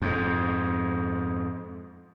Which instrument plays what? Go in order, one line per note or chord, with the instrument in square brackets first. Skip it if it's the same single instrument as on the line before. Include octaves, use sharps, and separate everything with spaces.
[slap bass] F2 G#2